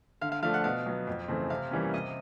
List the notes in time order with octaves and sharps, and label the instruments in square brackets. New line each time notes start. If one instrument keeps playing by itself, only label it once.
[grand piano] D3 [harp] F5
[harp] F5
[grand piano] F3 A3 D4 [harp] F5
[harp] F#5
[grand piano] B2 [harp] F5
[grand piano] F#3 B3
F2
C#3 E3 A3 C4
[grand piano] C3 [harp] F5
[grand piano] E3 G3 A#3 C#4
[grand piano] C3 [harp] D#5